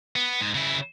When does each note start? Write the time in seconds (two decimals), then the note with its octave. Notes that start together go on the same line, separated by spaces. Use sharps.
0.16 B3
0.41 G#2 G#3
0.55 C#3 E4